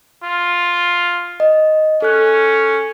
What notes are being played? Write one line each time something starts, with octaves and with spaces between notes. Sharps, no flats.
F4
D#5
C#4 A4 F#6